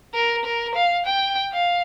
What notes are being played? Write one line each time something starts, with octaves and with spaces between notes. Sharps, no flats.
A#4
A#4
F5
G5
F5